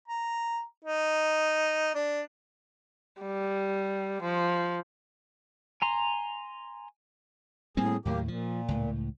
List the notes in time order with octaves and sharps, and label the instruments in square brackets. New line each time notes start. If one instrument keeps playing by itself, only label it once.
[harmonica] A#5
D#4
D4
[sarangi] G3
F3
[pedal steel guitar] G#5 A#5 C6
[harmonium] A2 G#4 [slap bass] G3 A#3 C4
[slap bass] D#2 A2 F#3 [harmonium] A#3 G4
[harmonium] A#2 [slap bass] F3
[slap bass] C#2 A2